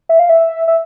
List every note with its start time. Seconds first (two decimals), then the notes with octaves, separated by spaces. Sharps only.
0.09 E5
0.19 F5
0.29 E5
0.68 E5